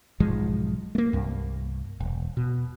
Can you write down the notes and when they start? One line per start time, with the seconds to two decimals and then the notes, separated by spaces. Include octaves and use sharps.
0.20 B1 G#2 F3 G#3
0.95 A3 A#3
1.13 C2 G2
2.00 E1
2.37 B2